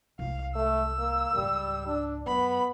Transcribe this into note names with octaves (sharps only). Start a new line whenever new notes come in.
C2 G#3 F5
A3 E6
A#3
C#2 G#2 G3
D4
F#2 B3 B5